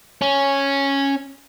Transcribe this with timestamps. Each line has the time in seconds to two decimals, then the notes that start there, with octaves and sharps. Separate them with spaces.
0.22 C#4